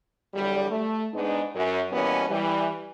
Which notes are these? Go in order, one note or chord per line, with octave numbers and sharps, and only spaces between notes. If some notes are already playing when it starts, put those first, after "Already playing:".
E2 D3 F#3 G3
A3
G#2 G#3 B3 D4 D#4
F#2
B2 E3 G3 A#3 B3 C#4
E3 G3